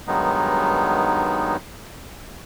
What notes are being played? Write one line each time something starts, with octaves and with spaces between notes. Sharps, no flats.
G2 D#3 F#3 G#3 B3 D#4